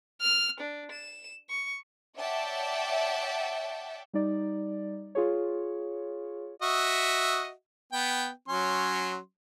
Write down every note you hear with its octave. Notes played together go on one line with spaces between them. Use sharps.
F6
D4
E7
C#6
C#5 D5 E5 F#5 G5 A5
G3 D#4 D5
F4 G#4 C#5
F#4 D#5 E5
B3 G5
F#3 C#4 C6